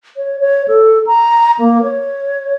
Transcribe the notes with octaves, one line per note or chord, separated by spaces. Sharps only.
C#5
C#5
A4
A#5
A#3
C#5